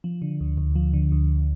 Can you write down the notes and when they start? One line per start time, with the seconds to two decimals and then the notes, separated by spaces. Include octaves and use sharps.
0.04 F3
0.22 D3
0.40 D2
0.58 D2
0.75 F3
0.94 D3
1.12 D2